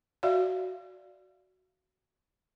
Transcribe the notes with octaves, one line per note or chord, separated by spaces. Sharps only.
F#4 D5 E5 F5